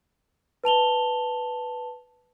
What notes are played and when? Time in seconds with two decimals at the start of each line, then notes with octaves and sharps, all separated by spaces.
0.64 B4 A5 F7 G7